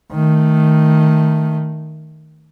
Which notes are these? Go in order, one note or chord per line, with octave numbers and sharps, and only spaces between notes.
D#3 A3